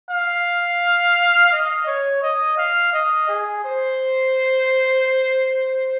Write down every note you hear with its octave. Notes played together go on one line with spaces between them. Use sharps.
F5
D#5
C#5
D#5
F5
D#5
G#4
C5